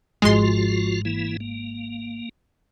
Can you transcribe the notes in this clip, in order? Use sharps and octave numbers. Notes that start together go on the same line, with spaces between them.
G#1 G#2 F3 G#3 F4 F#4 C6
E3 A#3 E4
A#3